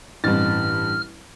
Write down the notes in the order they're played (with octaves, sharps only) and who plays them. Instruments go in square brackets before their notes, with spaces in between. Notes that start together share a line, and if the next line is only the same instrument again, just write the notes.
[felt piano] A1 [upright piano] G2 C4 A6 [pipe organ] F6